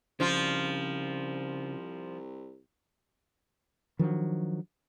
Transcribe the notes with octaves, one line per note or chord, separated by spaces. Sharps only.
C2 C#3 F3 D4 F4
D#3 F3 F#3 D4